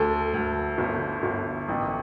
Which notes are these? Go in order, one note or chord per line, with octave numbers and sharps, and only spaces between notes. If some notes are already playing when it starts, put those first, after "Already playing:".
Already playing: D2 A4
D2
G1
G1
A1